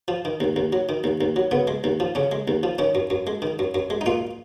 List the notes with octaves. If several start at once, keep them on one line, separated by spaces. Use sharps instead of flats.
F3
D#3
D#2
D#2
F#3
D#3
D#2
D#2
F#3
C#3 B3
G#3
D#2
F3
C#3 C#4
G#3
D#2
F3
D#3 C#4
F#2
F#2
G#3
D#3
F#2
F#2
G#3
D#4
A#2 F4